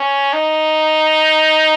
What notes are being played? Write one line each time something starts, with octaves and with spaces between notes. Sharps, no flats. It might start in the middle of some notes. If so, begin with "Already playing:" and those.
Already playing: C#4
D#4